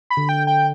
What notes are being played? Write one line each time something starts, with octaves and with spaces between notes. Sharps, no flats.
B5
D3
G5
G5